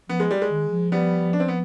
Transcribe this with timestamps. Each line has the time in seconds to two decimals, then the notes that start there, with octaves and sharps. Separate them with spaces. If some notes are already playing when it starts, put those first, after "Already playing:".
0.09 F3 B3
0.20 G#3
0.31 G3
0.42 G#3
0.50 D#3
0.70 F3
0.92 G3 B3
1.33 D4
1.40 C4
1.48 B3